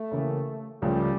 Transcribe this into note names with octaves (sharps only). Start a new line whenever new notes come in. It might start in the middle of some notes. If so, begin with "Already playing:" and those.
Already playing: A3
C#3 E3 A#3 E4 G4
C#2 C#3 F3 G3 A3